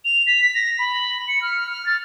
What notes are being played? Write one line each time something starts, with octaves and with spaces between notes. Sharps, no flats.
F7
B6
A#6
B5
C#7
F6
F6
A6